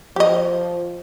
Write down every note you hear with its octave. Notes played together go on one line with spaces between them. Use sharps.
F3 G4 D#5